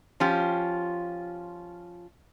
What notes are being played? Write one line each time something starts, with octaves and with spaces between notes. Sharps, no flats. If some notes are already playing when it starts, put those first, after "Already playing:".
F3 C#4 F4 G4